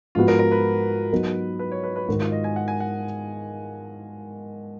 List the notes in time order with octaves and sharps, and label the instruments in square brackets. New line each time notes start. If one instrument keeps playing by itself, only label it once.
[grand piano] G#2 F3 B3 F#4 [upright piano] F4
[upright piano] A#4
A#4
B4
[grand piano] F#3 B3 D#4 A#4
[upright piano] B4
C#5
B4
B4
[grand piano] G#2 D#3 G#3 D#4 [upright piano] F#4
[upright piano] F4
D#5
G#5
F#5
G#5
F#5